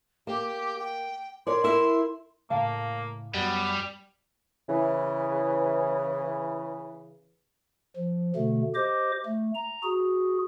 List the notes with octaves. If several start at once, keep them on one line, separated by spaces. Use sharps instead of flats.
A#3 G4
G5
A#4 C#5 D5 C6
E4 A#4 E5
A2 C#3 A#3 F5 A5
F#2 G3 B3
C#3 E3
F3
B2 D3 A3
G4 C5 D#5 D6
A3
A#5
F#4 G#4